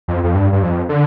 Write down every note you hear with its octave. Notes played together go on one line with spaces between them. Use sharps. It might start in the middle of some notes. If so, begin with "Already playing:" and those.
F2
F2
G2
G2
F2
D3